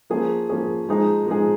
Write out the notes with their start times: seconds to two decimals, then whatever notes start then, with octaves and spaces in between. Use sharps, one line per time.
0.10 F3 A#3 C#4 G#4
0.49 F3 A#3 C#4 G#4
0.89 F3 G#3 D#4 G#4
1.27 F3 G#3 D#4 G#4